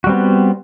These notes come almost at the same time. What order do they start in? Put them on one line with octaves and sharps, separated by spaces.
F#4 G3 C4 B3